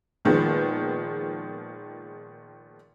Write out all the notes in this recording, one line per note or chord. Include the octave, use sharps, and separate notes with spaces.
A#2 D#3 F3 G#3 B3